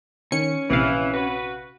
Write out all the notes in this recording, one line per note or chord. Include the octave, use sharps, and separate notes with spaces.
D#3 C#4 C#7
A#1 C3 E3 F5
F#4 B4